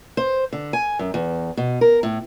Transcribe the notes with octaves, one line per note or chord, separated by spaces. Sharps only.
C5
D3
G#5
F#2
E2
B2
A#4
A2